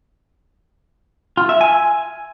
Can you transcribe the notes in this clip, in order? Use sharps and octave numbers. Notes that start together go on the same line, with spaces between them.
F4
E5
G#5